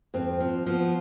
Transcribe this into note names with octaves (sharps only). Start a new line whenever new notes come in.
F2 C4
F3 C4
F3 B3